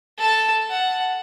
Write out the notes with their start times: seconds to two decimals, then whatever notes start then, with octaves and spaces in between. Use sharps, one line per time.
0.18 A4 A5
0.70 F#5